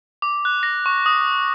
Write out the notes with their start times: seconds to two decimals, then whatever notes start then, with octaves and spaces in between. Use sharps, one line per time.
0.22 D6
0.45 F#6
0.63 A#6
0.86 C#6
1.06 D#6